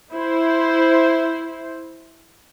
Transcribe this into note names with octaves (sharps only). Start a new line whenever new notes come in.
E4 C5